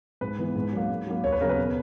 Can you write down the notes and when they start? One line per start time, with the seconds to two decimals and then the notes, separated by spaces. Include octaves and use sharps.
0.21 G#2 B4
0.39 E3 B3
0.55 G#2
0.72 F#3 A#3
0.90 G#2
1.06 F#3 A#3
1.24 D#2 C#5
1.32 B4
1.41 C#3 F#3 B3 A#4
1.49 B4
1.58 B2